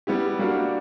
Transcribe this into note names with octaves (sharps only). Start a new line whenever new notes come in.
G3 B3 E4 G4
G3 A#3 D4 F#4 A#4